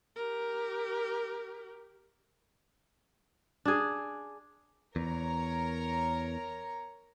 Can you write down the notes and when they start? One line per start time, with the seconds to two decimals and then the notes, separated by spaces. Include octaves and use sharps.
0.15 G4 A#4
3.65 D4 G#4
4.96 E2 A#4 C#5 A#5